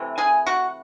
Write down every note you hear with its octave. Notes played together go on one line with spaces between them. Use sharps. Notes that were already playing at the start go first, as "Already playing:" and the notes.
Already playing: C3 E3 A3
G#4 G#5
F#4 F#5